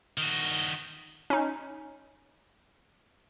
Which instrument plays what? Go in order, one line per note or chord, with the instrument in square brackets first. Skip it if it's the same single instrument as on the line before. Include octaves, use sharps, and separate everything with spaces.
[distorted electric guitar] D#3 F#4
[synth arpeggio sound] C#4 D#4